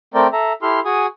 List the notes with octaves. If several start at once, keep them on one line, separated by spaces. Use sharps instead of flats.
A3 C4 A#4 D5 G5
A4 E5 A#5
E4 G4 A4 C6 F6
F#4 G#4 G#5 D#6